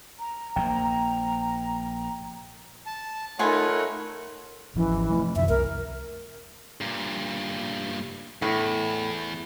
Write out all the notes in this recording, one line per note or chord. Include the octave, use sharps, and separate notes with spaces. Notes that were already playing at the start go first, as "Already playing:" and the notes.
A#5
A#1 A#3 G5
A5
A3 D#4 F4 A#4 C#5 F#5 G#5 B5
G#1 E3 F3 C#4
F3 A3
F#2 C3 D#3 E5
C2 A#4
G2 A#2
E2 A2